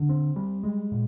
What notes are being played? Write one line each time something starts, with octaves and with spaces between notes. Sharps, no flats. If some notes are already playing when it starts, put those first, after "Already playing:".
Already playing: D3
C4
G3
G#3
A#2